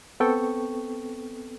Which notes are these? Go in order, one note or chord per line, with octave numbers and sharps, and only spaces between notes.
B3 C4 A4 G5 C#6